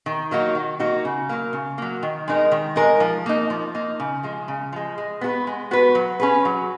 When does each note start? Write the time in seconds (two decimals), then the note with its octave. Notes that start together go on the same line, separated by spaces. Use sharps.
0.06 D#3
0.31 F#3 A#3 D#4 F#4
0.55 D#3
0.79 F#3 A#3 D#4 F#4
1.05 C#3
1.29 F#3 A#3
1.53 C#3
1.78 F#3 A#3
2.03 D#3
2.28 G#3 D#4 A#4
2.52 D#3
2.76 G#3 D#4 A#4
3.00 F3
3.26 A#3 D#4
3.50 F3
3.75 A#3 D#4
4.00 C#3
4.23 F3 G#3
4.48 C#3
4.73 F3 G#3
4.98 G#3
5.21 B3 F#4 B4
5.47 G#3
5.71 B3 F#4 B4
5.95 F#3
6.20 C#4 G#4 B4
6.45 F#3